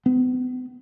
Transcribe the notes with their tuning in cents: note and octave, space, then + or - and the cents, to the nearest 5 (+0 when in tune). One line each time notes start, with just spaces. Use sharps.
B3 +40